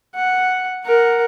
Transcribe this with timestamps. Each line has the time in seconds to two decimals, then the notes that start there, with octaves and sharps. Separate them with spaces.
0.15 F#5
0.85 A#4 F#5